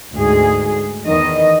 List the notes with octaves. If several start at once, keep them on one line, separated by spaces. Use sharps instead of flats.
D2 G#2 G#4
E2 D#3 D#5